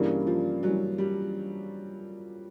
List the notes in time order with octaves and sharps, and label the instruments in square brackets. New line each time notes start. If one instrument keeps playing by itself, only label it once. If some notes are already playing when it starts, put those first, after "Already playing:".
Already playing: [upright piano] G2 E3 G3 A#3 C#4 [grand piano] C#3
[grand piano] F3
[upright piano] G2 E3 G3 A#3 C#4 [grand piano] F#3
[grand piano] G3